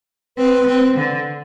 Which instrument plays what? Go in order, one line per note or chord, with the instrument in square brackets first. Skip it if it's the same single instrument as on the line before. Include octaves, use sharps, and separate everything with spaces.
[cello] C4 [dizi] B4
[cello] C4
D3